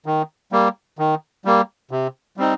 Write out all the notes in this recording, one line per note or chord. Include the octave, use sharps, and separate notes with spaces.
D#3
G3 A#3
D#3
G3 A#3
C3
G3 C4 D#4